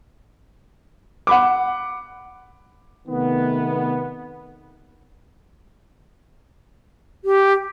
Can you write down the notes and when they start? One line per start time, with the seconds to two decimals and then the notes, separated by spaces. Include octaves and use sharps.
1.27 F#5 B5 D6
3.08 C3 D#3 A3 B3
7.24 G4